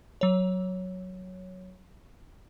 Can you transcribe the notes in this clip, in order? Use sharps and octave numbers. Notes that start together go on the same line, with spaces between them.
F#3 C#5